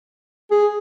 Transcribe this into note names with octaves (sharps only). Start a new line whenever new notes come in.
G#4